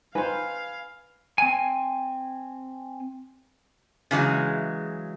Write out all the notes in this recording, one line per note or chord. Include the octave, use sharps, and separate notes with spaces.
D#4 B4 C5 F5 G#5
C4 G#5
C#3 E3 F#3 G#3